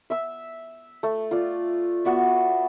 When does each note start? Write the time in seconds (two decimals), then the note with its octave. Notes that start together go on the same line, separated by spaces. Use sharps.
0.10 E5 E6
1.03 A3
1.31 F4 D5
2.05 B3 F#4 D5 E5